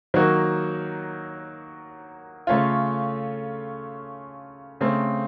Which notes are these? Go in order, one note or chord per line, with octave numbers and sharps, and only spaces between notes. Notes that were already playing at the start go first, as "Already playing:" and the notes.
D#3 F#3 A#3 D#4 F#4
C#3 A3 C#4 F4
C#3 A3 C4